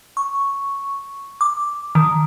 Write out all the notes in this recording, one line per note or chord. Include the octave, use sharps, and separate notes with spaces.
C#6
D6
D#3